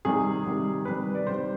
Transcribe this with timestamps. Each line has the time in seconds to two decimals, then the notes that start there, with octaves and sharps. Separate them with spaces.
0.05 C3 D#3 G3 G#4
0.46 C3 D#3 G3
0.85 C3 D#3 G3 B4
1.15 D5
1.26 C3 D#3 G3 C5